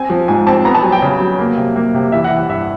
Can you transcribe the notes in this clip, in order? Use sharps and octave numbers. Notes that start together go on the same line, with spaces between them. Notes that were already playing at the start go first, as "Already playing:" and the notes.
Already playing: C4 G#5
F3
G#2 G#5
C4 A5
B3 A#5
A5
F#3 G#5
G5
C#3
F#3
A#3
C3
A#3
C3
E3 E5
F#5
E3
F#5
G2 E5